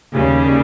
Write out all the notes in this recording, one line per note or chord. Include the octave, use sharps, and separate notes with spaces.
D#2 C#3 G3